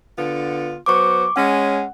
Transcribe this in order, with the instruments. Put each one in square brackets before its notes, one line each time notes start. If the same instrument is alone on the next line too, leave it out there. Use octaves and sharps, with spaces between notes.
[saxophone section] D3 B3 F4
[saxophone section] F#3 B3 C5 [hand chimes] C#6 D6
[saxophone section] G#3 C#4 [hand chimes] F#5